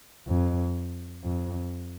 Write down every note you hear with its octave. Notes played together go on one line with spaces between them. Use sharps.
F2
F2